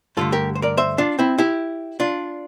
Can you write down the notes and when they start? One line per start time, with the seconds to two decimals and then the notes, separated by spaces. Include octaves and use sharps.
0.17 G2 D3 A3 F4 A4
0.32 G4 A#4
0.55 C5
0.62 A#4 D5
0.77 C5 E5
0.98 D4 F4
1.19 C4 E4
1.38 E4 G4
2.00 D4 F4